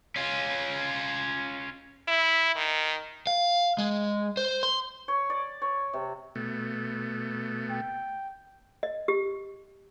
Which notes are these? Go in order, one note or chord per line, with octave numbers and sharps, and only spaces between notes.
C#4 F4
E4
D#3
F5
G#3
C5
C6
C#5
D5
C#5
C3
B2 A3
G5
D#5
G4